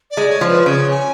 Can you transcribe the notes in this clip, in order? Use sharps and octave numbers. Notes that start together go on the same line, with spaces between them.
D5
G#3
C#5
F3
B4
C#3 C#5
G#5